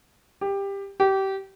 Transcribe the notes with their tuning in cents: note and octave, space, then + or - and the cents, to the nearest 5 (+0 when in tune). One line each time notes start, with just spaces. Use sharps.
G4 +15
G4 -25